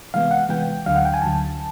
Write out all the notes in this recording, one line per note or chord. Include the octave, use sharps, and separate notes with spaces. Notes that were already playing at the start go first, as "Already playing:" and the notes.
C3 E3 G#3 B3 F5
F#5
C3 E3 G#3 B3 G5
D2 D3 F#3 F5
F#5
G5
G#5
D2 D3 F#3 A5